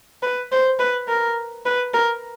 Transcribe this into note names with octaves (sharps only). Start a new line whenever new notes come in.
B4
C5
B4
A#4
B4
A#4